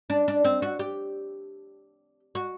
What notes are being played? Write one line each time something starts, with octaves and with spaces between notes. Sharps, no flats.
D4
D4
C4
F#4
G4
F#4